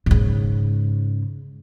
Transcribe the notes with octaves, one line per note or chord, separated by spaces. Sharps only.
G#2 C#3